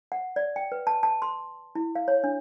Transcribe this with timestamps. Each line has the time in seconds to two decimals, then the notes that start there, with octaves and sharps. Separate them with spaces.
0.12 F#5
0.36 D5
0.56 G5
0.72 B4
0.87 A5
1.03 A5
1.22 C6
1.75 E4
1.95 F5
2.08 C#5
2.24 D4